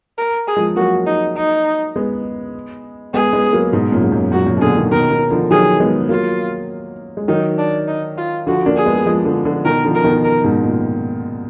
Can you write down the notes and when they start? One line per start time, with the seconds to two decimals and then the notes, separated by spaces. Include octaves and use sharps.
0.18 A#4
0.47 G#4
0.57 F3 G#3
0.76 F#3 A#3 F#4
1.06 D#4
1.36 D#4
1.96 G#3 B3
3.14 G#3 B3 G#4
3.33 G#3 B3
3.53 F#3 A#3
3.72 G#2 B2
3.92 F#2 A#2
4.04 G#2
4.12 F#2
4.32 F#2 A#2 F#4
4.47 F#2 A#2
4.57 B2
4.61 A#2 D3 G#4
4.77 B2 D#3
4.91 B2 D#3 A#4
5.11 B2 D#3
5.31 D3 F3
5.51 D#3 F#3 G#4
5.80 G#3 B3
6.09 F#3 A#3 F4
7.17 G#3
7.28 D#3 F#3 D#4
7.58 D4
7.87 D#4
8.17 F4
8.47 D3 F3 F#4
8.66 A#3 D4
8.76 G#4
8.86 G#3 B3
9.06 F3 G#3
9.25 D3 F3
9.45 D3 F3
9.65 B2 D#3 A#4
9.85 D3 F3
9.95 A#4
10.04 B2 D#3
10.24 A#4
10.44 G#2 B2
10.64 A#2